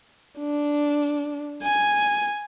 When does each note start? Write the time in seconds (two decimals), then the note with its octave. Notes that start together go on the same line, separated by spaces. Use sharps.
0.39 D4
1.63 G#5